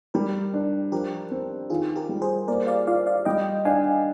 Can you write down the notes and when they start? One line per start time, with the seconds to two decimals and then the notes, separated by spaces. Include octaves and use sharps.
0.14 G3 G4 A#4
0.53 D4
0.92 F3 G4 A#4
1.31 C4
1.70 D#3 F4 G#4
1.96 G4 A#4
2.09 G3
2.22 G#4 C5
2.48 A#3 A#4 D5
2.67 D5 F5
2.87 F4 D5 F5
3.07 D5 F5
3.25 G3 D#5 G5
3.65 D4 F5 G#5